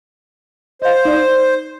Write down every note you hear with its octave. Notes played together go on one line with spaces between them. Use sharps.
C5 D#5 F5
D#4 D5